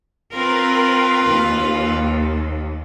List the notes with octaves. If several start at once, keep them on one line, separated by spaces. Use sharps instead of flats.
C4 F4 A#4 B4
D#2